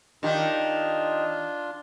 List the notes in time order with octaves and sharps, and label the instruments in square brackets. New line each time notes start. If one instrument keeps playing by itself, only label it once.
[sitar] D#3 G4 [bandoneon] D4 F4